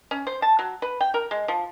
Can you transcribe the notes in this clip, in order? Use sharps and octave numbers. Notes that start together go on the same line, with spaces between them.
C#4
C5
A5
F#3
B4
G5
A#4
G#3
F3